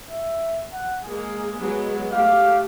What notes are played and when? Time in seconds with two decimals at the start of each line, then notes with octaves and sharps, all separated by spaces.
0.10 E5
0.73 F#5
1.04 G#3 A#3 G#4
1.56 F#3 G#3 B3
2.12 A3 G4 F5